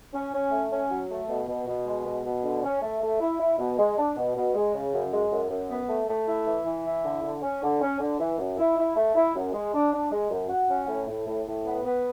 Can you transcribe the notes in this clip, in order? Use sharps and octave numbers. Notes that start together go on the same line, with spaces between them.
C#4
C#4
A3
C#4
F#3
A3
B2
B2
B2
G#3
B2
B2
D3
C#4
A3
A3
E4
E4
B2
G#3
D4
B2
B2
G#3
C#3
F#2
G#3
F#2
F#2
B3
A3
A3
E4
E3
E3
E4
D3
D3
C#4
D3
C#4
D3
E3
F#2
E4
E4
A3
E4
F#2
G#3
D4
D4
G#3
F#2
F#4
C#4
A2
A2
A2
A2
B3
B3